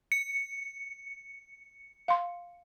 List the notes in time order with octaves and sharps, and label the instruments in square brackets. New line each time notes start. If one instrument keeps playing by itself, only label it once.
[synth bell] C#7
[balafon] F5 C6